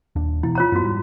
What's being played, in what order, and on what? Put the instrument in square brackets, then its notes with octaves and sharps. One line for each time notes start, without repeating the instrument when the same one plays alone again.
[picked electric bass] D#1 D#2 D4
[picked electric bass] B2 E3 [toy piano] E4
[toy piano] F4 C#5 A#5
[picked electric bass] F#2 B3 [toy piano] E4 F#4
[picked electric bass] G#2 G3